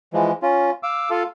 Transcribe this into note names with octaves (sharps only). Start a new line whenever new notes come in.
E3 F3 G#3
C#4 F4
F5 D6 E6
F4 A4 F5